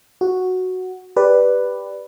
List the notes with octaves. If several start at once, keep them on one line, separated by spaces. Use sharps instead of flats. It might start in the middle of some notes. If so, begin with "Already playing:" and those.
F#4
G4 B4 D5